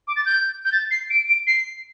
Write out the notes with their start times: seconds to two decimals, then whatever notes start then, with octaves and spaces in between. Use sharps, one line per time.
0.07 D6
0.16 A6
0.25 G6
0.65 G6
0.72 A6
0.90 C7
1.10 D7
1.27 D7
1.46 C7